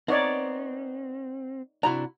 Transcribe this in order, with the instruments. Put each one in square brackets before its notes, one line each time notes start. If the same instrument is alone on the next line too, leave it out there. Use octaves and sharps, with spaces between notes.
[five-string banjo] B3 [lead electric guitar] C4 [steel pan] D#4 C#5 D5
[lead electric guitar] C3 D4 [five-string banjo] E4 F#4 A#5